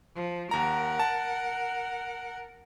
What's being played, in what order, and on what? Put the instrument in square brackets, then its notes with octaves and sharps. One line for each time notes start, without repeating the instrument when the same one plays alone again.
[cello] F3
[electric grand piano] D#2 A#5 [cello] A#4 F#5
[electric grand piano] A5